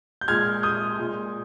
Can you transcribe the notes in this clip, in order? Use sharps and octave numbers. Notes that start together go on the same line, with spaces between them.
G6
A#2 G#3 F6 G#6
D#6 G6
A#2 G#3